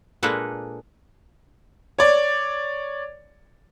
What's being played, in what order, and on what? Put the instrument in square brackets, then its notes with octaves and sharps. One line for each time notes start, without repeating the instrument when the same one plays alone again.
[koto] A#2 G#3 A#3 D4 A4 B4
[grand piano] C#5 D5